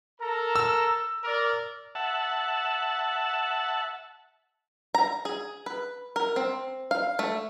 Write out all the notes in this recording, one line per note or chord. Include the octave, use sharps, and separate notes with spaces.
A4 A#4 A#5
E6
A#4 D5
E5 F#5 A5
A#5
G#4
B4
A#4
C4
F5
A3